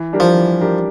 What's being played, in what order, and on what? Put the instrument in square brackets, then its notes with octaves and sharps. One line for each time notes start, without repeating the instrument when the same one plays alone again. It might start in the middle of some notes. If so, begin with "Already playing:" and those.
Already playing: [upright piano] E3
G3 D4 G4 A#4
[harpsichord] F3
[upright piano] E3
G3 D4 G4 A#4